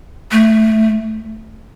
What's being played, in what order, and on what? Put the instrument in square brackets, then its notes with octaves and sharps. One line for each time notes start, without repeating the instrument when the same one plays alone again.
[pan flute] A3